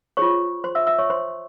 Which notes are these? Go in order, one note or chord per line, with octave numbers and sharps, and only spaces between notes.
F4 G#4 C5 C#5 C#6
C5 C6
E5 E6
E5 E6
C#5 C#6
C5 C6